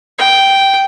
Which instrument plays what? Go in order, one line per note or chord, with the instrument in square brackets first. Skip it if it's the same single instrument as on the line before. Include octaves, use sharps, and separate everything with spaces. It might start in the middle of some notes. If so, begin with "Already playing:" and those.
[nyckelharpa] G5